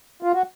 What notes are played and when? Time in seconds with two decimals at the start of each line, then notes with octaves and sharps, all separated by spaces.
0.23 F4
0.33 F#4